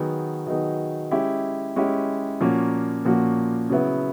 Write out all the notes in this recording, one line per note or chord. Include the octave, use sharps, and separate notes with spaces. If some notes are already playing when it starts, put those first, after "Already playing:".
Already playing: D#3 F#3 B3 D#4 G#4
D#3 F#3 B3 D#4 G#4
G#3 C#4 E4 G4
G#3 C#4 E4 G4
A#2 F3 A#3 C#4 F#4
A#2 F3 A#3 C#4 F#4
C#3 F#3 B3 E4